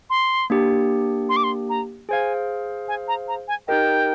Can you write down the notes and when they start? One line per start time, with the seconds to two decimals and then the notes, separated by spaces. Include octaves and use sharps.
0.10 C6
0.50 A#3 D4 G4
1.29 C6
1.37 D6
1.44 C6
1.70 A#5
2.09 G#4 C5 F5 G#5
2.88 G#5
3.08 A#5
3.28 A#5
3.48 G#5
3.68 D#4 G4 A#4 D#5 G5